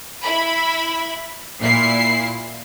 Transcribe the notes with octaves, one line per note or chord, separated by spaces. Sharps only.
E4 B5
A#2 E4 C7